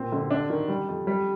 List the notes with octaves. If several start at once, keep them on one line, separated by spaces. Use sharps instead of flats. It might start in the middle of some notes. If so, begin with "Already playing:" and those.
Already playing: A#2 C4
D3
D4
D#3
G3
F2
G3